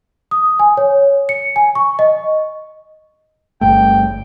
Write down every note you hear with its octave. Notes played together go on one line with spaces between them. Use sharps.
D#6
G#5
C#5
C#7
G#5
C#6
D#5
G1 G2 A3 G5